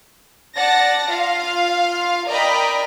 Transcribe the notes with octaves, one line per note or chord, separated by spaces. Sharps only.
D5 F#5 A5 A6 A#6
F4 F5
A#4 D5 D#5 G5 A#5 B5